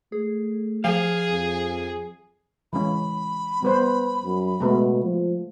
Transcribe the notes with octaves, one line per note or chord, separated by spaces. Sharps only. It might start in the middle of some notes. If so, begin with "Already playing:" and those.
A3 G#4
F3 G#4 F5 C7
F2
E3 G#3 C#4 B5
G3 B3 B4 C5
F#2
B2 G#3 A3 B3
F3